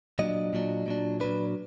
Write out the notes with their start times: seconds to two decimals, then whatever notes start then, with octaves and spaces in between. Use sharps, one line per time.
0.19 A#2 F#3 D4 D#5
0.53 A#2 F#3 D4
0.86 A#2 F#3 D4
1.20 A#2 F#3 D4 B4